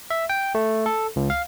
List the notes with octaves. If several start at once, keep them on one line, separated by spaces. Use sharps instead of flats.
E5
G5
A3
A4
C#2
F5